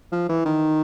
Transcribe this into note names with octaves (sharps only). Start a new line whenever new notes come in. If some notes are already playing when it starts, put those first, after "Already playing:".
F3
E3
D#3